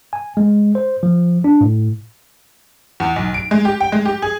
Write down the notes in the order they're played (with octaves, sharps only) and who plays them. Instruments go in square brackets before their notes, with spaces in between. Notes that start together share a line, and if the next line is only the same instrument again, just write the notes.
[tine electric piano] G#5
G#3
C5
F3
D4
A2
[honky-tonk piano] E2
B1
D7
G#3
G4
G5
G#3
G4
G#4